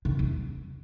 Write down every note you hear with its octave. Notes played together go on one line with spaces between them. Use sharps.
C3
E2